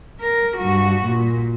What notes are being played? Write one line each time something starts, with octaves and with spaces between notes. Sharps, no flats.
A#4
G2 F#4
A#2